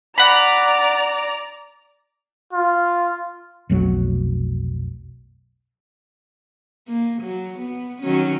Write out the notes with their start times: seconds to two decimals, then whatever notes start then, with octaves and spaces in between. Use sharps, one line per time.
0.18 D5 F#5 A#5 B5
2.53 F4
3.69 F1 B1 F#3
6.89 A#3
7.22 F#3
7.59 B3
8.02 D#3 F#3 C#4